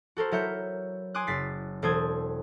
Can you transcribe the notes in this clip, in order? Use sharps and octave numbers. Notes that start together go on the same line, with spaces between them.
F#4 A4 A#4 C5
F#3 E4 A#4 E5 G6 C#7
G#5 C6 D6 D#6 F#6
F#1 A6 B6 C7
E1 C4 A4 C5 D#6 G#6